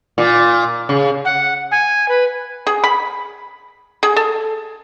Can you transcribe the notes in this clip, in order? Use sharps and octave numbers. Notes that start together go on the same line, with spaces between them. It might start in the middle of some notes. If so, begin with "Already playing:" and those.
A#2
C#3
F#5
G#5
B4
G#4
B5
G#4
A4